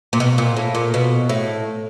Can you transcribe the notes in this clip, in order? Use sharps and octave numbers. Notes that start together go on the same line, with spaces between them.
A#2
B2
A#2
A2
A#2
B2
A2